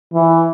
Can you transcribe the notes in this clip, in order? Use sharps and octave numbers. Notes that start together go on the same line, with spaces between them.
E3